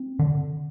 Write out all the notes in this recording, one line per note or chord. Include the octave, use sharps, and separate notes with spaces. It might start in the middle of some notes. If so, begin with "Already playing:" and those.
Already playing: C4
D3